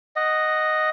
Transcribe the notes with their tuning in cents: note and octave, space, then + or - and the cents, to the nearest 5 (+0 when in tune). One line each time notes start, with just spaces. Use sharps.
D#5 +0 F#5 +0